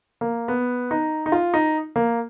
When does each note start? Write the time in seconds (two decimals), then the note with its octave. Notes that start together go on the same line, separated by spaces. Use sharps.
0.21 A#3
0.48 B3
0.91 D#4
1.26 D#4
1.32 F4
1.54 D#4
1.96 A#3